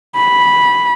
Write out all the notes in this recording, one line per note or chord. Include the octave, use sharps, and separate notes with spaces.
B5